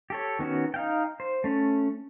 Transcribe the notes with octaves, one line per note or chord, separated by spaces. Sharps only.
G4 A4 C#5
D#3 B3 C#4 F#4
D#4 F5 G5
C5
A3 C#4